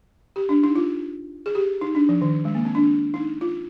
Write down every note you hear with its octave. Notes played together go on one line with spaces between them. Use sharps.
G4
D4
D#4
F4
G#4
G4
D#4
D4
F3
D#3
G#3
A#3
C4
D4
D#4
F4